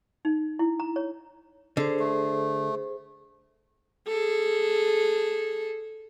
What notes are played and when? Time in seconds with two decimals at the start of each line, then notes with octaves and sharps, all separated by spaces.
0.25 D#4
0.59 E4
0.80 A#5
0.96 C#5
1.77 D3 G#4 C5
2.00 A3
4.08 G#4 A4